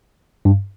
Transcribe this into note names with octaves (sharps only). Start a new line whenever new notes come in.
G2